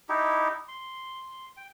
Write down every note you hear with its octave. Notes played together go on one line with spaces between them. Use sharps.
D#4 E4 G4
C6
G5